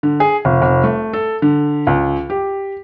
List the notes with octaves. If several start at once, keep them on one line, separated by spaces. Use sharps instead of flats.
D3
G#4
F1
F1
A3
A4
D3
C#2
G4